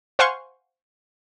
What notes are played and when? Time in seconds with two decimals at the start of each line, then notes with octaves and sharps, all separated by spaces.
0.19 C5 F5 F#5 G#5 C6 C#6